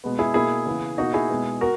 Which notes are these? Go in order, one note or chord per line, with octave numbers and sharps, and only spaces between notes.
B2 G#3 B3
E4 G#4
B2 A#3 E4 G#4
C#3 E3 B3
B2 A#3 D#4 F#4
E4 G#4
B2 G#3 B3
F#4 A#4